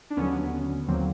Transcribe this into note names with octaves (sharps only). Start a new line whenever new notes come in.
D4
D#2 D3 F#3 B3 C#4
D#2 D3 F#3 A#3 C4